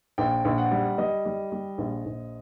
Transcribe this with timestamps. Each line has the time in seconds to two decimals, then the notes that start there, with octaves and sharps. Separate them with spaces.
0.18 A#1 G5
0.45 A#1
0.58 F#5
0.71 G3
0.98 G3 D#5
1.25 G3
1.52 G3
1.78 A#1
2.05 A#1